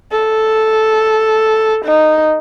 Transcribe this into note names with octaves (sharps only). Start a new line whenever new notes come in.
A4
D#4